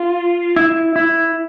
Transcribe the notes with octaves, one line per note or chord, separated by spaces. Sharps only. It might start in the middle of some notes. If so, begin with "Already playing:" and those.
Already playing: F4
E4
E4